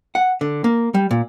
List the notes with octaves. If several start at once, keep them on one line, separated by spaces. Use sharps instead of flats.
F#5
D3
A#3
G3
A#2